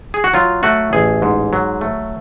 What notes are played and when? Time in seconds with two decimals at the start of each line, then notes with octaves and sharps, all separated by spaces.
0.14 G#4
0.24 F#4
0.34 F#3 F4
0.63 A3 F#4
0.93 A1 G#4
1.22 G#2
1.53 F#3
1.81 A3